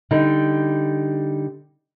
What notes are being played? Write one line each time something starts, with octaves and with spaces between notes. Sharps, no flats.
D3 G3 D#4